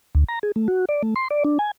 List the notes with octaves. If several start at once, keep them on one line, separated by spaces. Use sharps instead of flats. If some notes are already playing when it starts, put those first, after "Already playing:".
D2
A#5
G#4
A3
F#4
D5
A3
C6
D5
D4
G#5